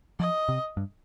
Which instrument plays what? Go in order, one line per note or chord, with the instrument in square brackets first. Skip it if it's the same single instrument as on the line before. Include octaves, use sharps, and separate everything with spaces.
[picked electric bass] F3 [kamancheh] D#5
[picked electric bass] C3
G2